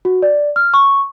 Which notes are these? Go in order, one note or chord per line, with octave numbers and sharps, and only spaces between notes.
F#4
D5
F6
C#6